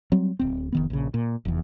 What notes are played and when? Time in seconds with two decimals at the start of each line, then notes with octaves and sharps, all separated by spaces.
0.12 F#3 G3 C4
0.39 D1 C4
0.72 F1 D#3 B3
0.90 A#1 C#3
1.14 A#2
1.45 F1 E2